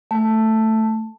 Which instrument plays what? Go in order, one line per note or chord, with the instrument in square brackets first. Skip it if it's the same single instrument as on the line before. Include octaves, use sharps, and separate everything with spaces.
[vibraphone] A3